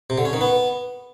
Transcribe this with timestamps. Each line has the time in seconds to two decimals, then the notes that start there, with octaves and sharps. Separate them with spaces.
0.10 C3
0.18 D3
0.25 C#4
0.33 D#3
0.41 B3